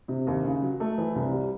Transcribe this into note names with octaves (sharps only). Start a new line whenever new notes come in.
C3
D#2
C#3
F#3
A3
E3
C2
G3